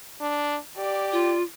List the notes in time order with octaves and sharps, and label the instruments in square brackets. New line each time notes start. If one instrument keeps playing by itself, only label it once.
[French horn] D4
[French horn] G4 [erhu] D5
[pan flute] F4